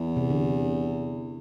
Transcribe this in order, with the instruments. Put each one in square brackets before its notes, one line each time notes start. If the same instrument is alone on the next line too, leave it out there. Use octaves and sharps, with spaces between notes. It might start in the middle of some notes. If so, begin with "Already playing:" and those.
Already playing: [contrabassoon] E2
[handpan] C3
D3